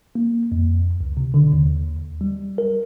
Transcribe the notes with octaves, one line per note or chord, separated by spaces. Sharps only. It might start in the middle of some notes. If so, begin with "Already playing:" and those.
A#3
F2
C#2
C3
D3
D#2
G3
A#4